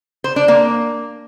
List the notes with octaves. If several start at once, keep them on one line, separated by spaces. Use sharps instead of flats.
C5
D4
A#3